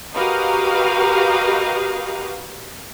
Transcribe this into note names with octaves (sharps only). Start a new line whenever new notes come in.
F#4 G4 A#4 B4 D#5 F5